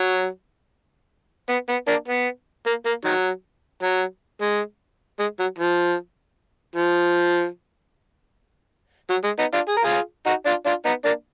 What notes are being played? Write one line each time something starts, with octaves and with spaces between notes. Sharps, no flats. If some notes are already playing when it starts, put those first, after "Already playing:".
Already playing: F#3
B3
B3
A#3 D4
B3
A#3
A#3
D#3 F#3
F#3
G#3
G#3
F#3
F3
F3
F#3
G#3
B3 D#4
D4 F4
G#4
A#4
F4 G#4
D#4 F#4
D4 F4
D4 F4
B3 D#4
A#3 D4